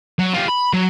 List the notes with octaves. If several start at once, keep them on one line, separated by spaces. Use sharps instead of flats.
F#3
F4 G4
B5
F#3